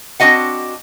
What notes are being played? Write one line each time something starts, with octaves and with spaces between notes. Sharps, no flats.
C4 D4 F#4 D#5 F#5